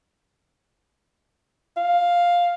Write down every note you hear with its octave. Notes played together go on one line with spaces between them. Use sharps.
F5